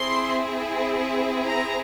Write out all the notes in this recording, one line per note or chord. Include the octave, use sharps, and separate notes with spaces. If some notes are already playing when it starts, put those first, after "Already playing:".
Already playing: C4 E4 G#4 C6
A#5